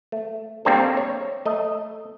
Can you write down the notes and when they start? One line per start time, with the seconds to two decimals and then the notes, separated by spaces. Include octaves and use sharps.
0.12 A3
0.65 G3 A#3 C4 D4 G#4 A4
0.97 C#5
1.46 A3 D#5